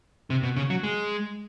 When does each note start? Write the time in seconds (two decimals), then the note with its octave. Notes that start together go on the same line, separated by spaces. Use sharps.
0.30 C3
0.43 B2
0.56 C#3
0.70 F#3
0.83 G#3